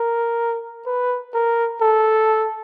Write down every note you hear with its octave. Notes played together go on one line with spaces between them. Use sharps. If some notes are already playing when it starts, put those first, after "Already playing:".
Already playing: A#4
B4
A#4
A4